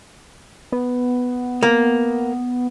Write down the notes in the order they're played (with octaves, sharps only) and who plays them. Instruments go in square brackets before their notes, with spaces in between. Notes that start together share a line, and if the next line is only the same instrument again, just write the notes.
[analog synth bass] B3
[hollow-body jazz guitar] A#3